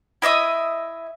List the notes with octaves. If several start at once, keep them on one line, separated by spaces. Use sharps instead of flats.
E4 D#5 E5 D#6